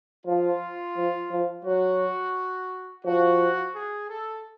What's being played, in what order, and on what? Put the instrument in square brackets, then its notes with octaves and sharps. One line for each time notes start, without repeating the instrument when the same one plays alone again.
[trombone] F3 [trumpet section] F4
[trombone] F3
F3
[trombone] F#3 [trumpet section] F#4
[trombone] F3 [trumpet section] F#4
[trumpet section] G#4
A4